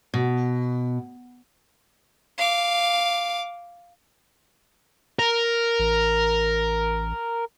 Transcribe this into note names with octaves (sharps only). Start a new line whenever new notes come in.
B2
F5 D6
A#4
A1